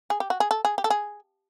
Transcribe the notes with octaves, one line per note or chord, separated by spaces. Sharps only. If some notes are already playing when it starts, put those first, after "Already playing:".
G#4
G4
F#4
G#4
A4
G#4
G4
A4
G#4